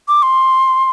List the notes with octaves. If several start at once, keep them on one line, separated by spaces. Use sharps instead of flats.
D6
C6